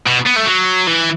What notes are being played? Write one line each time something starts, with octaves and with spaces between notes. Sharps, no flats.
B2
B3
A3
F#3
E3